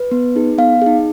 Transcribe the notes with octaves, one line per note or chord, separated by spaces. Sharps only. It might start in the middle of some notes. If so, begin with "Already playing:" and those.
Already playing: B4
B3
D#4 G#4
B3 F5
D#4 G#4